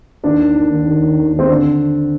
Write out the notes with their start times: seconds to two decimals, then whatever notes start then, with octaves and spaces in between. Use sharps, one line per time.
0.23 D#2 D4
0.39 D#3
0.55 D#3
0.70 D#2
0.86 D#2
1.02 D#3
1.18 D#2
1.33 D#3
1.39 C4
1.49 D3 D4